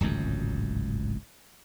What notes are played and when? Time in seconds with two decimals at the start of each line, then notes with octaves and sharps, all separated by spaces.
0.01 D1 G#1 C#2 F#2